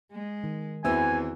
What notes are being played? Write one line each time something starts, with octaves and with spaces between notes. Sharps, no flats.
G#3
D#3
E2 E3 C4 F#4 B4 E5 G#5 E6